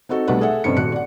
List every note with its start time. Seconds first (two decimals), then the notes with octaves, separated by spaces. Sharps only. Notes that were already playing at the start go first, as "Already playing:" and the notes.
0.09 C4 D#4 F#4 A4
0.28 B1 C3 G3 A3 B4 F#5
0.41 G#4 A4 E5 F#5
0.64 F1 G2 C4 C#4 C#7
0.77 D#1 F#4 F#6 C#7
0.92 D5 F#5